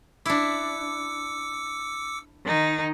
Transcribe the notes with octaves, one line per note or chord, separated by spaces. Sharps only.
D4 E4 D6 E6 C#7
D#3 D#4